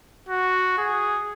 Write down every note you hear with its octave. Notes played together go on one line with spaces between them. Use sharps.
F#4
G#4